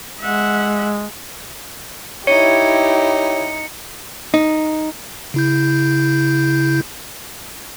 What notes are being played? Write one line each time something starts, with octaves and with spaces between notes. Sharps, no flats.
G#3 E5 F#5
D#4 E4 G4 C#5 C#7
D#4
C#3 E4 G6